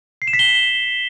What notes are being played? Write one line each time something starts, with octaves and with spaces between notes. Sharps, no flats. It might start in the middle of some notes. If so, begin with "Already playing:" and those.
C7
E7
B6
G7